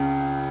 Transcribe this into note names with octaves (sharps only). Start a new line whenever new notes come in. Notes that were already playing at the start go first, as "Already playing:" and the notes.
Already playing: C#2 C#3